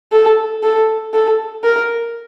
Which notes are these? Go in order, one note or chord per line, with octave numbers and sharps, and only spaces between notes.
A4
A4
A4
A#4